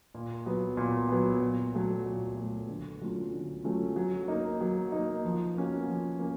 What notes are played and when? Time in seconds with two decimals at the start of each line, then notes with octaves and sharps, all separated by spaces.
0.14 A#2
0.46 F#3 B3
0.77 A#2
1.09 F#3 B3
1.42 A#2
1.74 F#3 A3
2.06 A#2
2.37 F#3 A3
2.69 D3
3.02 F#3 A3 C#4 F4
3.33 D3
3.64 F#3 A3 C#4 F4
3.96 F#3
4.28 A#3 D#4
4.61 F#3
4.92 A#3 D#4
5.25 F3
5.56 A#3 C#4 F#4
5.88 F3
6.19 A#3 C#4